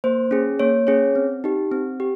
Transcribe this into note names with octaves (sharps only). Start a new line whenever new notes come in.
A#3 C5
C#4 G#4
A#3 C#5
C#4 G#4 C#5
C4
D#4 G4
C4
G4